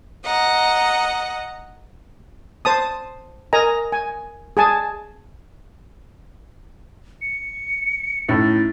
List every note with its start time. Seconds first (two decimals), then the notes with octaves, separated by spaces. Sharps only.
0.25 D#5 F#5 A#5
2.65 C5 A5 D#6
3.53 A#4 D#5 G#5 A#5
3.92 G#5
4.57 G#4 G#5 A5
7.21 C#7
8.29 A2 C#4 D#4 E4 A6